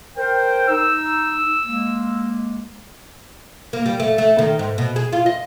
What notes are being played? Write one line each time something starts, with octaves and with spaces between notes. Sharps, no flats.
A#4 C5 G5
D#4 E6
G#3 A#3
A#3
G3
A3
A3
D#3
G#2
B2
G#4
F4
D#5